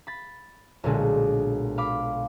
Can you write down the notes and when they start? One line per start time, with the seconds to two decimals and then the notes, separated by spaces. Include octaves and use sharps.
0.07 B5 A6
0.84 B1 A#2 D3 G#3
1.78 F5 B5 D6